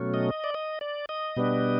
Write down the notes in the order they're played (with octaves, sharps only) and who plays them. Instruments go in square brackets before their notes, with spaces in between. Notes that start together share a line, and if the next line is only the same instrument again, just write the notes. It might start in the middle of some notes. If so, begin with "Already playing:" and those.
Already playing: [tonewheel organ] B2 F#3 A3 C#4
D#5
D5
D#5
D5
D#5
B2 G3 B3 D4